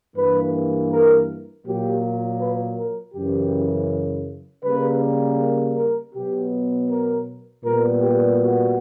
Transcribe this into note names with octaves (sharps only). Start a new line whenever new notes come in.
G2 E3 A#3 B4
A#4
A#2 F#3 A#3 G4
B4
A#4
F#2 C#3 E3 G4
C#3 G3 A#3 B4
A#4
B2 F#3 B3 G4
A#4
A#2 G3 B3 A#4
G4
F#4